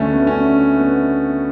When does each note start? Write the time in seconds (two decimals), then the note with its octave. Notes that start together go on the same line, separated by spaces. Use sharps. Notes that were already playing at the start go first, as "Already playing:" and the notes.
Already playing: D2 D3 A3 C#4
0.12 B3
0.27 C#4
0.78 B3